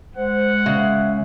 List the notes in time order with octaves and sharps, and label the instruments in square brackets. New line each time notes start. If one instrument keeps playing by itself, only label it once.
[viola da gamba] G#3 [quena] C5 [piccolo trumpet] F#5
[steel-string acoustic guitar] C#3 [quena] E5